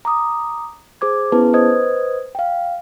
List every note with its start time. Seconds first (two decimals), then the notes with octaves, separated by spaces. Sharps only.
0.05 A#5 D6 D#6
1.01 G#4 C5 D6 G#6
1.32 B3 C#4 E4 G#4 B4 A5
1.53 B4 C5 D#5 D#6 G#6
2.35 F5 G5